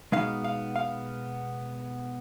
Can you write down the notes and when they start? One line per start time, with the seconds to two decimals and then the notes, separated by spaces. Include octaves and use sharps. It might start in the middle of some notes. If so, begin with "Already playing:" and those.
0.12 B2 G#3 B3 D#4 F5
0.44 F5
0.76 F5